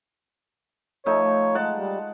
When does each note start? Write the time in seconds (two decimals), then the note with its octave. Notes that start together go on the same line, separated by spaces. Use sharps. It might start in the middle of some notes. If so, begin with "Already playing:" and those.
1.06 F3 A3 D#4 C#5
1.55 G#3 F#5 A5
1.77 G3